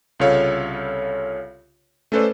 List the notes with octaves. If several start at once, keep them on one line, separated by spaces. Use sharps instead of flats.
C2 C#3 F4 A4 C#5 F5
A3 C#4 A4 B4 C5 D5